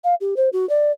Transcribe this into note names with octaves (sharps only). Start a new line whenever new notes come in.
F5
G4
C5
F#4
D5